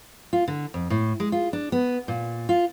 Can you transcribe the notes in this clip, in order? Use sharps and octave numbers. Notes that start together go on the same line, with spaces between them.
F4
D3
F2
A2
G#3
F4
D4
B3
A#2
F4